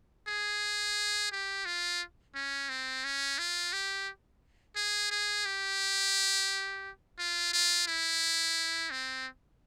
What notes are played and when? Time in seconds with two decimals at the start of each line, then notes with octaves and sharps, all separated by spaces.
0.28 G#4
1.32 G4
1.66 F4
2.35 C#4
2.70 C4
3.05 C#4
3.39 F4
3.73 G4
4.76 G#4
5.11 G#4
5.46 G4
7.19 F4
7.53 F4
7.88 E4
8.91 C4